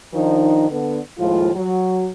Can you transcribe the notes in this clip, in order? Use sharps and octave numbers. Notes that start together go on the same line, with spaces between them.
D#3 F3 D4 D#4
D3 B3
D#2 A2 F3 G#3 F4
F#3 F#4